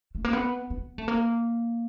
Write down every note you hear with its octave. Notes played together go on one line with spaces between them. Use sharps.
A3
A#3
B3
B3
A3
A#3